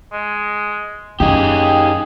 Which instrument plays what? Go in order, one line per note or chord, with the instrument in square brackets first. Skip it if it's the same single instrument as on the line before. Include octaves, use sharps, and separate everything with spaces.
[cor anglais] G#3
[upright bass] F#2 D#3 [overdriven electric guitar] D#4 G4 [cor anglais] G#4